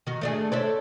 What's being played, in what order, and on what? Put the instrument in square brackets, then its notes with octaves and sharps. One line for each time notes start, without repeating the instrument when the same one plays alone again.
[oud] D#3 F#4
A3 D4 G#4
[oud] D4 A4 E5 [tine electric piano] C5 C#5